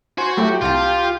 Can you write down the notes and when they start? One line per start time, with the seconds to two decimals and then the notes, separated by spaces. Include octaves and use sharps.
0.18 F#4 C5 G#5
0.37 F#3 A3 E4 G4
0.62 C2 F4 F#5 A5